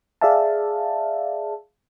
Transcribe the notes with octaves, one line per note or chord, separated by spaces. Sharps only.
G#4 D5 E5 F5 A5